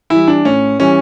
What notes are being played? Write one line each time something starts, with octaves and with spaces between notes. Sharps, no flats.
E3 G3 E4
D4
A2 C#4
E3 G3 C#4